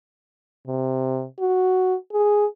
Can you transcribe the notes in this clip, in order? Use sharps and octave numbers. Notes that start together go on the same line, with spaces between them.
C3
F#4
G#4